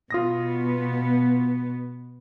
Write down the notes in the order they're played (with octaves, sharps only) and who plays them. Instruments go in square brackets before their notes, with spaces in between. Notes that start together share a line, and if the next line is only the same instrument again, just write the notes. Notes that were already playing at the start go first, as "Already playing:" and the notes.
[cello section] B2 B3 [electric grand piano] F4 D#6 A#6